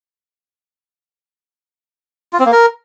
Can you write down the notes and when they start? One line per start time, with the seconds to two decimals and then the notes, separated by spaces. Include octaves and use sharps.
2.33 F4
2.39 C4
2.46 A#3
2.52 A#4